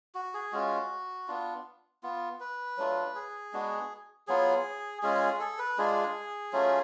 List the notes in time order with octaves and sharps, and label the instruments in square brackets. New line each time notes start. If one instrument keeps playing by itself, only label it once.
[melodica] F#4
G#4
G#3 C#4 F4 F#4
B3 D4 F4
B3 F4
B4
F#3 A3 D4 F4
G#4
G#3 B3 D4 F#4
F#3 B3 F4 G#4
G#3 C#4 F4 G#4
A4
B4
G#3 D4 F4 G#4
F#3 A3 C#4 F4